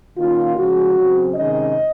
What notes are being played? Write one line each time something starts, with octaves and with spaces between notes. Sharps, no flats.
D#3 A#3 C#4 F4
C#3 F3 G#3 C#4 F#4
C#3 F#3 C4
C3 D#3 G#3 C#4 D#5